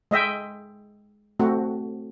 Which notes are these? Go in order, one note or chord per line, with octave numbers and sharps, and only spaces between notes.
G#3 D#5 E5 G5
A3 C4 F#4